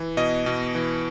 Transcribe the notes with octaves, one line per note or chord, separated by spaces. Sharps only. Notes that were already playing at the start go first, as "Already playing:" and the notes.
Already playing: E3
B2 D#5
B2
E3